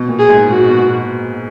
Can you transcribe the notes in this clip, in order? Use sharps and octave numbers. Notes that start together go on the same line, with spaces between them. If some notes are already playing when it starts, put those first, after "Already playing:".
Already playing: B2
A#2
G#4
G#2
A#2 F#4
B2
B2